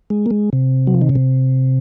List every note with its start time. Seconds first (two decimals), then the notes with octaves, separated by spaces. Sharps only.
0.10 G#3
0.26 A#3
0.31 G#3
0.53 C3
0.87 F#3
0.94 F3
1.01 D#3
1.09 C#3
1.15 C3